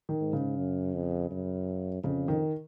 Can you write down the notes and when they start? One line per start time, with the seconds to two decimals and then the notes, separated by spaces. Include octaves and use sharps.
0.09 D#3
0.21 G#2
0.33 C#3
0.57 F#2
0.94 F2
1.31 F#2
2.03 F2 C#3
2.28 D#3